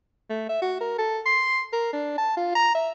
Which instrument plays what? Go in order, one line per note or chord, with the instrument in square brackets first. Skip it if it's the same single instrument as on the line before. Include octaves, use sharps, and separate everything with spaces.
[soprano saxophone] A3
E5
F#4
A#4
A4
C6
A#4
D4
A5
F4
A#5
E5